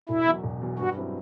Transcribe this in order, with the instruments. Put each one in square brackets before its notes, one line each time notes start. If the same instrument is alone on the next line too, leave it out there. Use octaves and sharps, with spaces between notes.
[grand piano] E1 [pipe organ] E4
[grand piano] E2 B2 F#3
E1
E2 B2 F#3
[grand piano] G2 [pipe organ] F#4
[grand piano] F#3 C4 E4